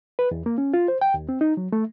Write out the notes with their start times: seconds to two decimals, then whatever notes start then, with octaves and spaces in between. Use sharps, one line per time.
0.19 B4
0.31 E2
0.46 A#3
0.58 C#4
0.74 F4
0.88 C5
1.01 G5
1.14 D#2
1.29 C4
1.41 D#4
1.57 F#3
1.73 A3